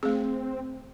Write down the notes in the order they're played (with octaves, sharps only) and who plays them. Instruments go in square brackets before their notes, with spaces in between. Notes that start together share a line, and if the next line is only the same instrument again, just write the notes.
[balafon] A3 G#4 [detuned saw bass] C4